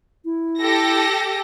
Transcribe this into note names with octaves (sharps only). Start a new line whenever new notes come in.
E4
G4 A4 A#6